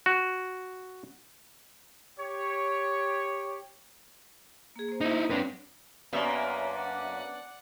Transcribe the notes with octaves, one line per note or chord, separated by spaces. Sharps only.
F#4
G4 C#5
A#3 G#4
A#3 C5
D#4 E4
F#3 C4 D4 B4 C#5
F#2 A#3 B3 C#4 D4 A#4 E5
D5 F#5